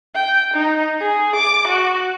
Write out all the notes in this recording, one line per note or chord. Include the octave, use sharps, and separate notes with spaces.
G5
D#4
G#4
D6
F#4